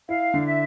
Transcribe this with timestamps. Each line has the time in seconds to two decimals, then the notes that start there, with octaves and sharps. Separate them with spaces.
0.09 E4 F5
0.34 D3
0.46 E5